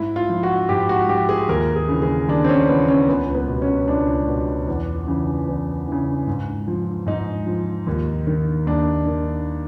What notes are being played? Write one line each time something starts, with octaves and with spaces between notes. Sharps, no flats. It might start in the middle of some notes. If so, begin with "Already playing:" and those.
Already playing: G#2 E4
F4
F3
F#4
G#2 G4
F#4
F3 G4
G#4
D#2 A#4
G#4
C#3 E3
G#4
D#2 D4
C4
C#4
C#3 E3 B3
C#4
C#2 B3
B3
B2
C#4
C#2 D4
B2
E2
C#3 E3
E2
C#3 E3
G#2
F3
G#2 D#4
F3
D#2
D#3
D#2 D4
D#3